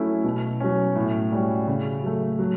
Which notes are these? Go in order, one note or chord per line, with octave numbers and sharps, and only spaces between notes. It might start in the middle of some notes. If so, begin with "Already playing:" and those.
Already playing: F#3 A3 C#4 E4
B2
F#3 C#4
A2
G3 C#4 F#4
C#3
F#3 A3
F#3